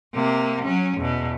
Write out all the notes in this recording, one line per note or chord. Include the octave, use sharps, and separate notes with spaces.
C3 A#3
F#3 C#4
E2 B2